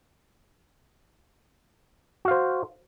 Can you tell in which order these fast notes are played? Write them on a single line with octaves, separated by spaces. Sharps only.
F#4 F5 C5